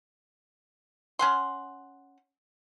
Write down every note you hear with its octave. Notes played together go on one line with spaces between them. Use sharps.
C#4 F#5 C6